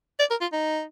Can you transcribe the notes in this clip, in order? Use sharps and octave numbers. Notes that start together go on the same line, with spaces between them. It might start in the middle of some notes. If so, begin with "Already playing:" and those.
D5
A#4
F4
D#4